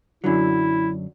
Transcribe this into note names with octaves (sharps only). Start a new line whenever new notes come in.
F#2 D3 F#3 E4